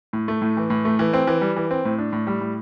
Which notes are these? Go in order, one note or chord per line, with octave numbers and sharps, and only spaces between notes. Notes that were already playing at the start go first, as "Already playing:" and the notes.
A2
A3
A2
E3
A2
A3
E3
C4
E3
G3
E3
C4
A2
D4
A2
G3
A2